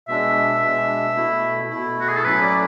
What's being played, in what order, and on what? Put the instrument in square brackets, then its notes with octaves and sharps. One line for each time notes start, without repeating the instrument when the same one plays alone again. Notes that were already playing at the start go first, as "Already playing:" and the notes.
[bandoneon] B2 G#3 D4 [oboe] E5
[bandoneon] B2 G#3 D4
B2 A3 E4
B2 A3 E4
[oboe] F#4
G#4
A4
[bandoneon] A2 F#3 A3 C#4 E4 [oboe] B4
[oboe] D5